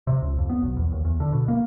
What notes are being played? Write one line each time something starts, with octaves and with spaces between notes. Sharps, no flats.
C3
C#2
F2
B3
B1
E2
D#2
E2
D3
B2
A#3